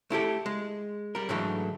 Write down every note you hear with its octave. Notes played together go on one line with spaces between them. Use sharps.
A3 E4 G4 A4
G#3
G3 A#4
G#2 D3 E3 F#3 A3